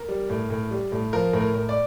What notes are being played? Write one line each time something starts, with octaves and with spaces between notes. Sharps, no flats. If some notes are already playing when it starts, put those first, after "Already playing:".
Already playing: A#4
G3
A2
A2
G3
A2
F3 A#4
A2
A#4
A2
D5